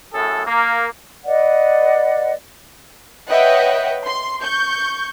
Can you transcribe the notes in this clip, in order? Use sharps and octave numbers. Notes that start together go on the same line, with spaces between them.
F#2 A2 G#4 A4
A#3
B4 D5 D#5 F#5
B4 C#5 D#5 E5 F#5 G5
C6
C#6 G6